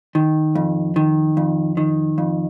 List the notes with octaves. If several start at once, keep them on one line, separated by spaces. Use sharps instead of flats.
D#3
F2
D#3
F2
D#3
F2